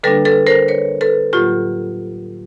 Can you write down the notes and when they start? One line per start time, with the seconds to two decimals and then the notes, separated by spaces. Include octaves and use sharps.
0.03 D3 G3 A#3 D4 A4 B4
0.25 A4 B4
0.47 A#4 C5
0.68 B4 C#5
1.01 A4 B4
1.33 A2 F#3 A#3 F4 G4